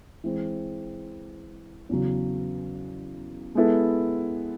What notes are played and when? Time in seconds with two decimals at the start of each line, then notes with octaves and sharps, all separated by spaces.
0.24 E3 G#3 C4
1.89 E2 C#3 F#3
3.55 G#3 B3 E4 A4